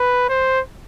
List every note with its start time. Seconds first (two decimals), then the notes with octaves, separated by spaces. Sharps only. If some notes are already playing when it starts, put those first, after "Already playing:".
Already playing: B4
0.29 C5